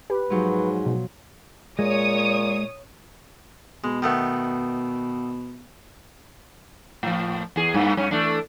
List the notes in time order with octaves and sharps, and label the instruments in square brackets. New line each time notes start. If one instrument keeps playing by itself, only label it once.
[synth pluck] G4 [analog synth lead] B4
[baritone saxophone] G#2 [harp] F3 F#3
[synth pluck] B2
[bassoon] A#2 [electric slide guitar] G#3 [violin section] C#5 D#6
[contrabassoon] B2 [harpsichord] G#3
[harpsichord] D#3 A3 B3
[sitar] A2 F3
E2 G#4
G2 A#3 B3
G2 C#4
E3 A3 D4